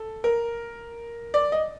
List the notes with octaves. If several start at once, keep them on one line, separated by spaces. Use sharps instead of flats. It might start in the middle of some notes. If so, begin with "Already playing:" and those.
Already playing: A4
A#4
D5
D#5